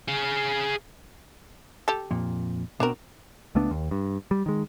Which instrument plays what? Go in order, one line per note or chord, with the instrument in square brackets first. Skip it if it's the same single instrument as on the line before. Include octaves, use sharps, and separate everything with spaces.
[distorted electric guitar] G#4 F5
[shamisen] G4 A4
[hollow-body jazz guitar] F2 A#2
[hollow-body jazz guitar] B2 C4 [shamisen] D4 F#4 A#4
[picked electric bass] C#2 A3 B3 D4
D#2
G2
G3
D#3 G#3